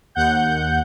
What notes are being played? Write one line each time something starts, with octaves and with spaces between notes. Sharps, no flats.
D#2 F#5 G6